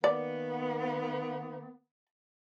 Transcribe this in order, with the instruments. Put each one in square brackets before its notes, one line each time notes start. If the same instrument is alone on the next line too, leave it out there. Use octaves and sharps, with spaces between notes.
[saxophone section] D#3 A#3 B3 [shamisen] D5